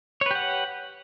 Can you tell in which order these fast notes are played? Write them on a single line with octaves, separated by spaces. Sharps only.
C#5 B4 G4 F#5